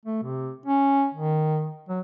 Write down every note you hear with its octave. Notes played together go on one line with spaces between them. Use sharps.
A3
C3
C#4
D#3
F#3